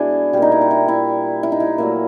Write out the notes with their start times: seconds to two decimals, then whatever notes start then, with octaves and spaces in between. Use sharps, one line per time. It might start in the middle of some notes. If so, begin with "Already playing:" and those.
Already playing: B2 G#3 D4 E4 G#4
0.33 A#2 G3 G4
0.42 D#4
0.52 E4
0.61 D#4
0.71 E4
0.88 E4
1.43 E4
1.52 D#4
1.60 E4
1.78 A#2 F#3 A3 E4